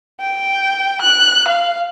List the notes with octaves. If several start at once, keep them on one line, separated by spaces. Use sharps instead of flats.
G5
F#6
F5